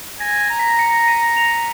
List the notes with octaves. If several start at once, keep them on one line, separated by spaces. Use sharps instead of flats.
G#5 A#6
A#6
A#5
B6
A#6 C#7
B6 D#7
C#7 F7